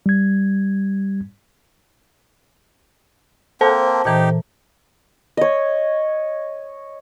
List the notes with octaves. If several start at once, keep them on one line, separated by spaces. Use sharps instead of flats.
G3 G#6
A#3 C4 A4 C5 A5
A#2 E3 D#4 G4 A#5
C#5 D#5